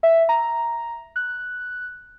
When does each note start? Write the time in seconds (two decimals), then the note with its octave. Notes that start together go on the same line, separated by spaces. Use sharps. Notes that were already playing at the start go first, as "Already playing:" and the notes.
0.03 E5
0.29 A#5
1.16 F#6